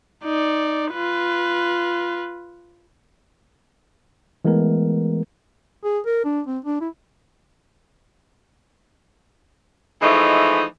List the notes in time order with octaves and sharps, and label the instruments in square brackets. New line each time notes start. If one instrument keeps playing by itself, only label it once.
[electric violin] D#4 D5
F4 B4
[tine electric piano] E3 G#3 A3 B3 A#4
[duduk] G#4
A#4
D4
C4
D4
E4
[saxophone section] E3 F3 G#3 A3 D#4